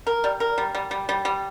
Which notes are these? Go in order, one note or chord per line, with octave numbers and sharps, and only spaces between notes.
A#4
G3
A#4
G3
G3
G3
G3
G3